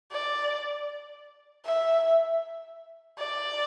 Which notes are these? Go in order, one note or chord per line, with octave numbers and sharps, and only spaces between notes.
D5
E5
D5